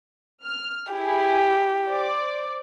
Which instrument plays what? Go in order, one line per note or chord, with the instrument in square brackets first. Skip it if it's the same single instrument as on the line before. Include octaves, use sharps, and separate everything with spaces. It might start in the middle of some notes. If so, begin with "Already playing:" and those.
[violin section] F6
[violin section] E4 G#4 [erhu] G4
[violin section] C5 D5 D6